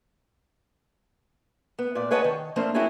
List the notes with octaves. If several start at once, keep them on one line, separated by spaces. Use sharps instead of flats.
B3
A#2 D5
G#4 B4 C#5 D#5 F#5 A5
D#3
F3 A3 A#3 C4 D4
C4 E4 F#4 G#4 C#5